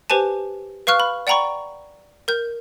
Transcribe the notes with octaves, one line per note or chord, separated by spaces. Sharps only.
G4 B4 C5 G#5 A5
B4 F5 C#6 F6 F#6
B5
D5 F#5 G5 A#5 B5 C#6
A#4 G6